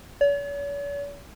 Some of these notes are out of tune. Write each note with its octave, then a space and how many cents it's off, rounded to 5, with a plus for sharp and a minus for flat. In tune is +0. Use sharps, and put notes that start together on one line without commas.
C#5 +45